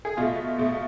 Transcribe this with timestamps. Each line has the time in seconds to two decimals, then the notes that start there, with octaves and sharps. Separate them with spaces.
0.05 G#4
0.17 B2 A3 F4
0.58 B2 A3